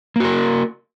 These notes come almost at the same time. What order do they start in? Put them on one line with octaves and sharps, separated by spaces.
A#3 F#4 A#4